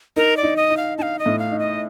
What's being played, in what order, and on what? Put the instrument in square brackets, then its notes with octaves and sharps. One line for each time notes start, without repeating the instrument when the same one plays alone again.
[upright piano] D#4 [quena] A#4
[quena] D5
[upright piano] D#4
[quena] D#5
[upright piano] D#4
[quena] F5
[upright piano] D#4 [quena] F5 A5
[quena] D#5
[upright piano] A2
[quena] F5
[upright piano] D#4
[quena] D#5